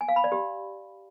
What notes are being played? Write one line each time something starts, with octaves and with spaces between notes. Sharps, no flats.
G#5
F5
B5
D5
G4